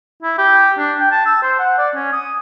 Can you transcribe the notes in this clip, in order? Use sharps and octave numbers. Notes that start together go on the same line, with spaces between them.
E4
G4
D4
G5
A5
E6
C5
F#5
D5
C#4
D#6